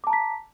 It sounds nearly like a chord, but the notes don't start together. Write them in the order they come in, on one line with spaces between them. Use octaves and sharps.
D6 A5 A#5 B6